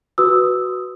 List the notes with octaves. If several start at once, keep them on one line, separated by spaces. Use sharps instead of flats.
F#4 B4 D#6 E6